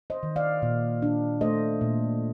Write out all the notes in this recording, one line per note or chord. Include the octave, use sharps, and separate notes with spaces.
C5 D#5
D#3
D5 F5
A#2
D4
A3 C5 D#5
A#2